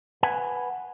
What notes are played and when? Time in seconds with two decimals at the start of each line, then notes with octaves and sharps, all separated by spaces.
0.23 B4 F#5 G#5